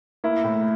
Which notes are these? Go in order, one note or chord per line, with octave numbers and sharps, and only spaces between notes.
A#3 E4
A2